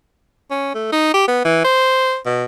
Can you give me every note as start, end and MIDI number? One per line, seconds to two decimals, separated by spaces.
0.51 0.73 61
0.74 0.92 57
0.92 1.10 63
1.14 1.27 67
1.28 1.44 59
1.45 1.61 52
1.65 2.17 72
2.26 2.45 47